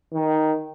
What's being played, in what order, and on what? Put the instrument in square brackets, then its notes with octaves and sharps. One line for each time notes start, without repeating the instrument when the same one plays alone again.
[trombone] D#3